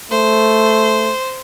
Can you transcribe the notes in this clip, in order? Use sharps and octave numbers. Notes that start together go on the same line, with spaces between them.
A3 C5